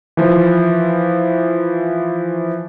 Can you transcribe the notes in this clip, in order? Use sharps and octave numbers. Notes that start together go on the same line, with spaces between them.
E3 F3